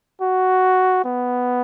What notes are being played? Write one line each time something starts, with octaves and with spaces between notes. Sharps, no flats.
F#4
B3